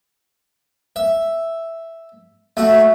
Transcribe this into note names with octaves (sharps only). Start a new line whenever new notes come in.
E5
A3 F#4 E5